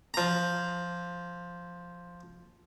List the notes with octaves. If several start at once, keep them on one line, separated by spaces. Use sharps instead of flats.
F3 A#5